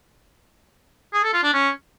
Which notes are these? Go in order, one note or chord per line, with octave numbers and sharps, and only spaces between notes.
G#4
A4
F4
D4
C#4